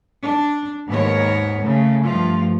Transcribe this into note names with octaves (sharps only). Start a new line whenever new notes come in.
D4
D#2 G#2 B3 A#4 C#5
C#3 A3
G2 F3 A3 F4